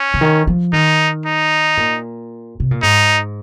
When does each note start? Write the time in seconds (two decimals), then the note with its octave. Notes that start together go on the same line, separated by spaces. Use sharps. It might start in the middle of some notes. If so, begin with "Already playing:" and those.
Already playing: C#4
0.14 C#3
0.21 D#3
0.47 F3
0.73 D#3 D#4
1.26 D#4
1.77 A#2
2.60 C3
2.71 A#2
2.83 G#2 D#4